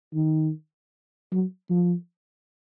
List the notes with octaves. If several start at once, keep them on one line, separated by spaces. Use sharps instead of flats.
D#3
F#3
F3